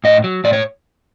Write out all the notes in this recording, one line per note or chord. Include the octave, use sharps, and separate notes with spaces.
A2 D#5
F#3
A2 D5
C#5